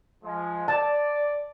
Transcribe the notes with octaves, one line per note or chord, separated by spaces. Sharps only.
F3 G#3
D5 A5